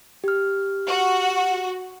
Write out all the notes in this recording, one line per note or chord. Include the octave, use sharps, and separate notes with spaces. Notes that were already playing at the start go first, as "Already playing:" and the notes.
G4 F6
F#4